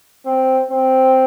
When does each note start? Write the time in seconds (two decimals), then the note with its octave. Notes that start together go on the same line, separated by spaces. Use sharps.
0.26 C4
0.71 C4